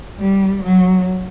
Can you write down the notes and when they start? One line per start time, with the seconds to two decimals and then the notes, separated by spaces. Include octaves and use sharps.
0.19 G3
0.63 F#3